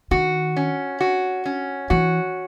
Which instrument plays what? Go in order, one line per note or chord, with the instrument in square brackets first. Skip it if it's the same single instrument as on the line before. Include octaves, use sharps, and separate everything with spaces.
[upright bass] D#3 [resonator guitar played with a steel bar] F#4
[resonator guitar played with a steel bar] C#4
F#4
C#4
[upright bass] E3 [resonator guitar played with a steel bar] F#4